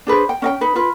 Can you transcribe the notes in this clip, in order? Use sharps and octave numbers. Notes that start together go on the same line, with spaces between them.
D4 G#4 B4 C5
G5
C#4 D#5 G5
D#4 B4
F4 B4